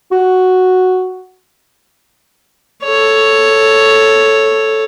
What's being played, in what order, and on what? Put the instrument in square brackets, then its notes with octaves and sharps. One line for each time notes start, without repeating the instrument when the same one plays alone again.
[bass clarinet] F#4
[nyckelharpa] A4 C#5